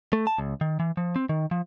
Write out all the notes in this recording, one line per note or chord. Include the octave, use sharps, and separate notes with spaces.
A3
A5
C#2
D#3
E3
F3
C4
D#3
F3